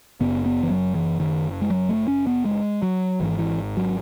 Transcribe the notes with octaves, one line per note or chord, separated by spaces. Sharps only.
F#1 F#2 C#3 B3
B3
E3
F#3
E3
D#3
G#3
F#3
A3
C#4
B3
G#3
F#3
G#1 G#2 E3
E3
F#3